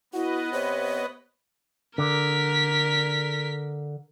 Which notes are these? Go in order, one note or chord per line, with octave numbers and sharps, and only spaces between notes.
B3 E4 F#4 B4 D#5
C3 C#5
D3 A#4 B6